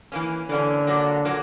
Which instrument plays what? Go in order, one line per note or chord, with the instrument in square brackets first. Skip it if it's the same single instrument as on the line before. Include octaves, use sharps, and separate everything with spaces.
[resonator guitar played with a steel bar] E3 A#3 C#4
[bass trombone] D3 [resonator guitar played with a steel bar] E3 A#3 C#4
[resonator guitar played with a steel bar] A#2 F#3 A#3
A#2 F#3 A#3